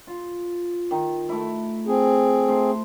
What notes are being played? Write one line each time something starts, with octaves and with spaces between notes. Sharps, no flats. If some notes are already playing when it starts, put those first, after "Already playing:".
F4
D#3
A3 E4
C4 G#4
A3 E4 C5